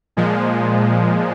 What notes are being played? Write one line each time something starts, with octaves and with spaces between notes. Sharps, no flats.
A#2 F3 G#3